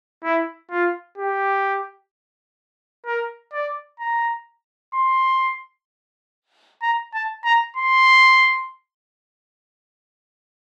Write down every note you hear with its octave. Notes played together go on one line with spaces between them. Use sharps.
E4
F4
G4
A#4
D5
A#5
C6
A#5
A5
A#5
C6